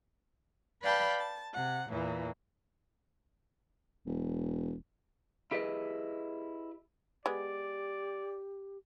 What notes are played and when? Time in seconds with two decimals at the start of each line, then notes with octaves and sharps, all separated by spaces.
0.82 B4 D5 F5 G5 A5 B5
1.19 A5
1.54 C3 F#5
1.91 E2 A#2 E3
4.06 E1
5.51 E4 G4 G#4 B4 D#5
7.26 G#3 B3 G4 D5